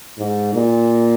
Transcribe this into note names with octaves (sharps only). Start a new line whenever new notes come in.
G#2
A#2